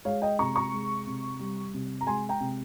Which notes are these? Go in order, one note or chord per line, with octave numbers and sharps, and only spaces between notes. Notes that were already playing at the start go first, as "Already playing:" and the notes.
G#3 C#5 F5
D#5 G5
C3 A#5 C#6
A#5 C#6
G#3
C3
G3
C3
A#5
G#3 G#5 C6
G5 A#5
C3